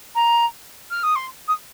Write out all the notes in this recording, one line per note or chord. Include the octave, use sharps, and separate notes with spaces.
A#5
F6
D#6
C6
D#6